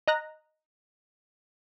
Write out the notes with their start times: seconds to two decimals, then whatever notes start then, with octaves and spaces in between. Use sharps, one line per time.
0.08 D#5 A#5 F#6 A#6